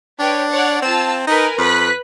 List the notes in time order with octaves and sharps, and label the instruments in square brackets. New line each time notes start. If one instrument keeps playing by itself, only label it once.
[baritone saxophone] D4 [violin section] B4 C#5 G5
[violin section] C#5 D5 F#5
[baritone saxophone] C4 [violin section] F4 A5 E6
[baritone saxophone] D#4 [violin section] A#4 B4 G#5
[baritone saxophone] F2 [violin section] B4 F#6 B6